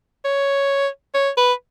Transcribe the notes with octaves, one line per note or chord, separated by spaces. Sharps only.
C#5
C#5
B4